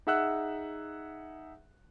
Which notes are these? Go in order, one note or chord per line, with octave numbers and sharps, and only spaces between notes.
D#4 G#4 E5 F#5 E6 F#6